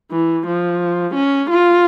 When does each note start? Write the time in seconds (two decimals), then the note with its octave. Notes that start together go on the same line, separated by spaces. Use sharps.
0.12 E3
0.47 F3
1.15 C#4
1.50 F4